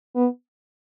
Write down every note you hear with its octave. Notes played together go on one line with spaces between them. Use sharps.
B3